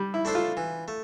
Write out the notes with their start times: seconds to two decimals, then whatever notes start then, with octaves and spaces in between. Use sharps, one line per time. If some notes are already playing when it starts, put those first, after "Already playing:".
Already playing: G3
0.14 E4
0.25 A3 D4 A4 C5
0.35 F4
0.57 E3
0.88 A3